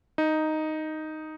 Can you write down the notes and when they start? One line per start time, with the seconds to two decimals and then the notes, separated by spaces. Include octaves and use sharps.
0.18 D#4